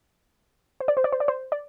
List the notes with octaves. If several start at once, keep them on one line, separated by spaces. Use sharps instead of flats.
C5
D5
C5
D5
C5
D5
C5
D5